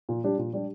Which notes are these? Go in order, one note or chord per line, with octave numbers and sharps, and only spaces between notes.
A#2
G3 D4 G4
A#2
G3 D4 G4